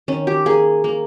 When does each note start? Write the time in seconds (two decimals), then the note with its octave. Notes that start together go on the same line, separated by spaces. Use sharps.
0.08 D#3 C#4
0.27 G4
0.46 A#3 G#4
0.84 A#3